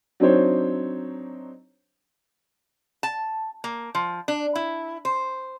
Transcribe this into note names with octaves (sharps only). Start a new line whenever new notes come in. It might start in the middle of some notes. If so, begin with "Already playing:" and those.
F#3 C4 D4 D#4 C5 C#5
A5
A#3
F3
D4
E4
C5